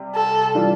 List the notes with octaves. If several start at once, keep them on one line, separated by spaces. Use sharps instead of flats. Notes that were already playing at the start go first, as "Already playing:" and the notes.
Already playing: C3 G3
A4
E3 G3 D4 F4